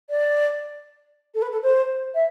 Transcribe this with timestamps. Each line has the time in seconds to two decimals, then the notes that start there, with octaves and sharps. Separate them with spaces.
0.10 D5
1.34 A4
1.42 B4
1.52 A4
1.63 C5
2.14 E5